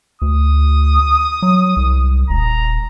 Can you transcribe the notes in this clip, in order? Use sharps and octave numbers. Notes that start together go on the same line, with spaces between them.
D2 D#6
F#3
C2
D#1 A#5